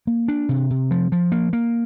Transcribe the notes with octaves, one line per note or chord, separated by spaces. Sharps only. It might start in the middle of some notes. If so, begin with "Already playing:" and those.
A#3
D4
C3
C3
F3
F3
A#3
A#3